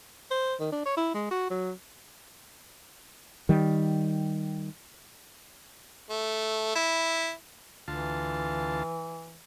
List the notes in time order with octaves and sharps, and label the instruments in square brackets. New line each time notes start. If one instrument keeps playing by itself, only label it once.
[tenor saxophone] C5
D#3
D4
C#5
E4
G#3
F#4
F#3
[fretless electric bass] D#3 G3
[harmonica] A3
E4
[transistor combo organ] D2 F4 A5 [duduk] E3